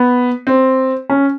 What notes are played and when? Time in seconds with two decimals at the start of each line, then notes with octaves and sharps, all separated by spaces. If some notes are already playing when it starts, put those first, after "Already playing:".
Already playing: B3
0.47 C4
1.10 C#4